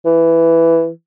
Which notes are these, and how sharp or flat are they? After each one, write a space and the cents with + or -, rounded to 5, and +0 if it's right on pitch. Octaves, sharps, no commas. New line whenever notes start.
E3 +5